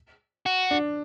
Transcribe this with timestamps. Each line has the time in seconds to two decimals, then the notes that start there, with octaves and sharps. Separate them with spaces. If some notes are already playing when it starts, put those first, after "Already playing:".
0.46 F#4
0.71 D4